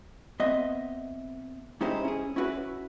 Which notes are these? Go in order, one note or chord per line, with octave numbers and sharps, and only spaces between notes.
B3 C4 D#5 E5
G#3 C#4 D#4 E4 G4 C5
C#4 G#4
C#4 E4 F#4 B4